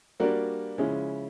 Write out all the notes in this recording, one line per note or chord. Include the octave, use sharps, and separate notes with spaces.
G3 A#3 D4 F#4 A#4
C#3 F3 G#3 C#4 E4